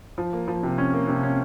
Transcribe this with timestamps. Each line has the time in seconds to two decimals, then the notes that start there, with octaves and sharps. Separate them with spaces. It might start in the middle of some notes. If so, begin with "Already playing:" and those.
0.18 F3
0.33 A#3
0.48 F3
0.63 C3
0.78 C#4
0.93 A#3
1.08 C3
1.23 C#4